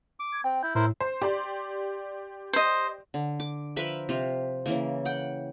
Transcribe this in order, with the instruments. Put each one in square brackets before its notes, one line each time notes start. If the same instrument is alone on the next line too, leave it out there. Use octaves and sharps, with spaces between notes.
[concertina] D6
[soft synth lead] G#6
[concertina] C4 [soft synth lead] G5
[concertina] E4 [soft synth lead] G6
[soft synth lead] A2 [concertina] E4 A#4 C5
[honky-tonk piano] C5
G4 D5 C6
[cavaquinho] C5 D#5
[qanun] D3
D6
F3 A#4 B4 E5
C3 F4
C#3 E3 A#3
F#5 G5